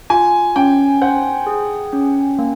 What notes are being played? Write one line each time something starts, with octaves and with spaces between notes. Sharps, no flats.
F4 G#5
C#4 G5
C5 F#5
G#4
C#4
A#3